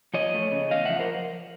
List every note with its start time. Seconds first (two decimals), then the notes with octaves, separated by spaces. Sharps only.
0.14 F3 C#5 D#5
0.34 A3
0.52 C#3
0.71 E2 D#5 F5
0.85 F3 E5 F#5
0.99 A#4 C5